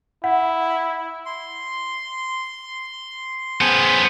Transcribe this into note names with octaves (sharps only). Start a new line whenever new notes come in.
E4 F#5
C6
B3 G#4 C5 A5